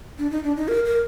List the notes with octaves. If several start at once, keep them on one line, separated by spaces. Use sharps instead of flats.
D4
D#4
D4
D#4
A#4
A#4